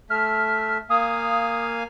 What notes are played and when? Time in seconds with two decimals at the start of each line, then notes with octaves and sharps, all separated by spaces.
0.10 A3 E5 F6
0.90 A#3 F5 G#5 D#6